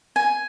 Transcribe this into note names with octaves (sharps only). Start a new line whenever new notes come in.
G#5